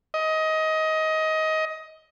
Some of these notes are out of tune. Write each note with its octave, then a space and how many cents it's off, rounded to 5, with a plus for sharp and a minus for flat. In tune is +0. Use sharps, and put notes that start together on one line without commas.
D#5 +20